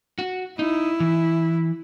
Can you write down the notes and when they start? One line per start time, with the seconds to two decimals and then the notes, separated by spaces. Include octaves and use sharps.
0.19 F#4
0.59 D#4 E4
1.00 E3